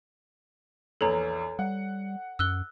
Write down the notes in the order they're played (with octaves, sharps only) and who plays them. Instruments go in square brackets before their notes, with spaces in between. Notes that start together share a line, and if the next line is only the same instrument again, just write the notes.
[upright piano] A#1 E2 [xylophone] A4 C#5 A#5
[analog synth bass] G3 [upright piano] F#5
[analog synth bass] F#2 [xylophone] E6 F#6 G7